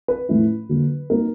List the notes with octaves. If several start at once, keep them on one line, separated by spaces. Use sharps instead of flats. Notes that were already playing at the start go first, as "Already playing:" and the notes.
B4
A2 F3 A3 C#4 E4
D3 F#3 A#3
F#3 A#3 D#4 A#4